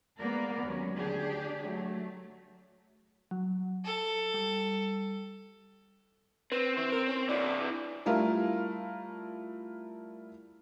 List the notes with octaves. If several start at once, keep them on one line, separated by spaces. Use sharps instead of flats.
G#3 A#3 B3 A#4 D5
D#2 F#3 C#4
D2 D4 G4 G#4
F#3 A3
F#3
A4
G3
C4 B4
E3 C4
A#4
C#4
C3 E3 D5
G3 A3 E4 F4 A#4 F5